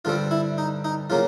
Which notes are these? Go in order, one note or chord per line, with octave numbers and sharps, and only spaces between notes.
G2 D3 G3 C4 F4
E4
D#4
D#4
C#3 F#3 A#3 F4